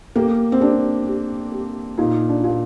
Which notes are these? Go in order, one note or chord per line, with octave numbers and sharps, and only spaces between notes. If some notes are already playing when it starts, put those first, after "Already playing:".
A#3 G4
C4
D4 G4
G4
G4
A#2 D#4
D4
A#2